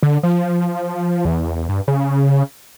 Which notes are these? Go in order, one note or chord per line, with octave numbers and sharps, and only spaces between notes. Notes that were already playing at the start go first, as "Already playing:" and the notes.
D3
F3
E2
G2
C#3